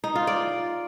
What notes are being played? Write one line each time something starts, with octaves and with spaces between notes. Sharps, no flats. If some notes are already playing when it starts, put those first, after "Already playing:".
D#4
F4
D5